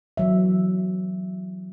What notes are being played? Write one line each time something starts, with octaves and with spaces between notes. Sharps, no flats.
E3 F#3 E5